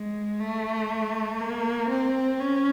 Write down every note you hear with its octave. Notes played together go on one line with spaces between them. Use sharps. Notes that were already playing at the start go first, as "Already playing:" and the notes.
Already playing: G#3
A3
A#3
C4
C#4